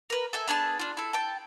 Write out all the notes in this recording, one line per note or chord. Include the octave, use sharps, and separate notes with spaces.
A#4 B4
A4 E5 G#5
B3 D4 G#4 A5
D4 F4
E4 A4
G5 A5